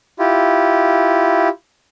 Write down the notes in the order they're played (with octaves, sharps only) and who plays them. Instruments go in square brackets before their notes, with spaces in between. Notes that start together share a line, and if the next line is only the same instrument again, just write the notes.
[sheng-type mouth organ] E4 F4 G4